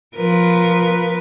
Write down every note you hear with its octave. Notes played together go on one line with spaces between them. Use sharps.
F3 A#4 B4